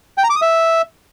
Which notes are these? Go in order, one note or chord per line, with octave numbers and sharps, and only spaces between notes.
G5
A#5
D6
D#6
E5